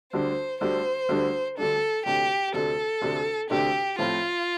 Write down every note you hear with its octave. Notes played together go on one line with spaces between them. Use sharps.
D2 D3 G3 D4 C5
D2 D3 G3 D4 C5
D2 D3 G3 D4
D2 D3 G3 D4 A4
D2 C3 A3 D4 G4
D2 C3 A3 D4 A4
D2 C3 A3 D4
D2 C3 A3 D4 G4
A2 F3 C4 F4